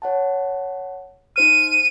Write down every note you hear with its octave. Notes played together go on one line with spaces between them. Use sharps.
C#5 F#5 A5
D#4 C5 F6 D#7